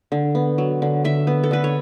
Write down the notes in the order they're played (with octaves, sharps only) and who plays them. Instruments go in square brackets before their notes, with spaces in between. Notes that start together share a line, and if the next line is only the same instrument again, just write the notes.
[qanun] D3
B3
F#3
D3
D3 E5
B3
A4
D3 B4
C#5